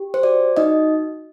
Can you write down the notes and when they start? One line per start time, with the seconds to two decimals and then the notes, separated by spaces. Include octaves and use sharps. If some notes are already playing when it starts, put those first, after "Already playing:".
Already playing: G4
0.14 C5
0.23 F#4 D5
0.57 D#4 F#4 D#5